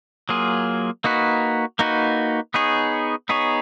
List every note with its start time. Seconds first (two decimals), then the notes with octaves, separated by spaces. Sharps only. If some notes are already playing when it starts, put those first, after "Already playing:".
0.29 F#3 A#3 F4 G#4
1.04 A#3 D#4 F#4 B4
1.79 A#3 D#4 F#4 B4
2.54 B3 D#4 G#4 C#5
3.29 B3 D#4 G#4 C#5